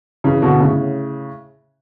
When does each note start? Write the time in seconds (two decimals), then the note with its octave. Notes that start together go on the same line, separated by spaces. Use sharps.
0.24 C#3 E3
0.42 B2 D3
0.60 A2 C#3